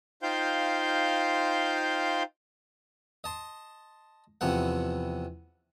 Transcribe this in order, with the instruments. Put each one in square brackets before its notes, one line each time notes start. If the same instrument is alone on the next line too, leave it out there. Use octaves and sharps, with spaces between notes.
[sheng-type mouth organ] D#4 F4 C5 F5 G5 G6
[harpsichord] D#5 A5 C6
E2 C3 F3 B3 F#5